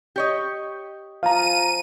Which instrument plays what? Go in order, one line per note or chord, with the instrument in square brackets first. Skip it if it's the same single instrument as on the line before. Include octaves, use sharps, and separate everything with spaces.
[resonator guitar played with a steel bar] G4 C#5 D#5
[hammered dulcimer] F3 F4 G#5 [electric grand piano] F5 A#5 [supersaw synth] D#7